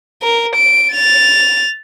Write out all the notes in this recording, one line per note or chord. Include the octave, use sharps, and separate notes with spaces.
A#4
D7
A6 F7